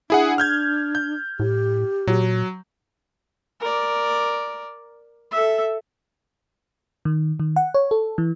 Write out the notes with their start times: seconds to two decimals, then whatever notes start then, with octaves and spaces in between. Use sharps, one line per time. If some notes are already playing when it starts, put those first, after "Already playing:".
0.10 D4 E4 G#4 F#5
0.38 F6 G6 G#6
0.95 G6
1.40 A2 G4
2.07 A#2 F#3
3.60 A#4 D5
5.31 A4 E5
7.05 D#3
7.40 D#3
7.56 F#5
7.74 C#5
7.91 A4
8.18 E3